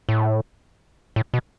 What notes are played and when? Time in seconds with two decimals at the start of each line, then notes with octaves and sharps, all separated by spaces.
0.09 A2
1.16 A2
1.34 B2